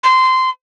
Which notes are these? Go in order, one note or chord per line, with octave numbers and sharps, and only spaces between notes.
C6